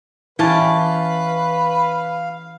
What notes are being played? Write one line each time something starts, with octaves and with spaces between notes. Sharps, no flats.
E3 C#4 G4 B4 F5 A5